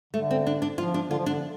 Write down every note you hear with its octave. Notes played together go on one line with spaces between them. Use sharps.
D3 A3
C4
D4
D4
F3 F4
D4
D3 F4
F3
D3 D4